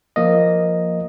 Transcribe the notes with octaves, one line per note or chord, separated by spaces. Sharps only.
F3 A#3 D#5